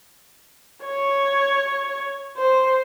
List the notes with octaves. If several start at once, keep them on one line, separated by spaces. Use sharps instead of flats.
C#5
C5